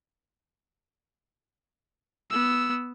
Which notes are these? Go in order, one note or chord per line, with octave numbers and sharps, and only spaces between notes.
B3 E6